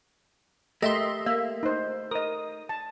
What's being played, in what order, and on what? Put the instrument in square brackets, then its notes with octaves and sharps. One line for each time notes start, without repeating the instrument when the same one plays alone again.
[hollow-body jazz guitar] A3 G4 [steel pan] A#4 [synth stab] D#5 E5 C6
[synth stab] A#3 [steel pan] E5
[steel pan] D#4 C5
[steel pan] A#4 D#5 [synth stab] D#6
[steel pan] A5